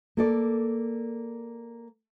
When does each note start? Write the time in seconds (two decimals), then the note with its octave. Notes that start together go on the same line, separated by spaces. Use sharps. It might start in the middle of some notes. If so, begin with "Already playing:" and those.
0.17 A#3 A4 D5